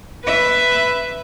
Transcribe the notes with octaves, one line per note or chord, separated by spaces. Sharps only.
B4 E5